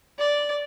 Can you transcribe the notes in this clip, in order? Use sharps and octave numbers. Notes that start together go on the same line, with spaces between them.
D5